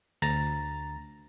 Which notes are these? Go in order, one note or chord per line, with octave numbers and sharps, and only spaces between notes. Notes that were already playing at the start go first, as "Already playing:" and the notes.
D2 A#5 A6